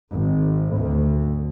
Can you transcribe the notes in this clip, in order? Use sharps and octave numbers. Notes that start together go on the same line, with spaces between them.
G#1
D2